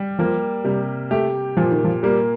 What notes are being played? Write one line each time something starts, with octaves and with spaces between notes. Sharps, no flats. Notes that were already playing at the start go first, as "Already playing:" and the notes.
Already playing: G3
F3 A#3
C3 G3
A3 G4
A#2 F3
D#3
F3
G3 A#3